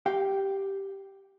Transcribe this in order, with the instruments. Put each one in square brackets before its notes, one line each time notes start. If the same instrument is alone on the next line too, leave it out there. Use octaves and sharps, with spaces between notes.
[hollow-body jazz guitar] G4 F5 G5